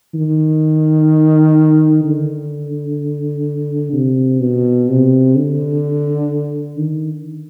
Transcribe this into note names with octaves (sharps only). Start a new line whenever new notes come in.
D#3
D3
C3
B2
C3
D3
D#3